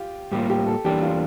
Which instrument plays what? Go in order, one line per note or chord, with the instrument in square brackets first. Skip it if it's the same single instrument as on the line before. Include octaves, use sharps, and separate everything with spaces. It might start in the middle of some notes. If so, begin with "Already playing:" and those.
Already playing: [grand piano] F4 G4
[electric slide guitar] A2 G3 A#3 F4 [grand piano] G4
[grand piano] G4
A4
[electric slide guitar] E2 E3 G3 A#3 D4 [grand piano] G4
[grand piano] F4